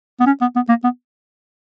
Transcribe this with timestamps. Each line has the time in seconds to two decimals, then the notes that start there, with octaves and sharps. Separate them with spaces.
0.20 B3
0.27 C#4
0.41 B3
0.56 B3
0.69 A#3
0.84 B3